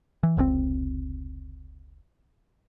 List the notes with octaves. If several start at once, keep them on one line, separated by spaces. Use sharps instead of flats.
E3
F1 C#2 A2 C4